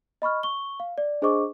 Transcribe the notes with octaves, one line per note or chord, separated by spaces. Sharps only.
D#5 B5 C#6 F6
C#6 G7
F5
D5
D4 G#4 C5 D#5 C#6 D6